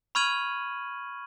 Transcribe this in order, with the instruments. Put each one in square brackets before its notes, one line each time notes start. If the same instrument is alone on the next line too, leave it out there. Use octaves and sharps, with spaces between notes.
[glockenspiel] B5 C#6 F6 G#6 D#7 F#7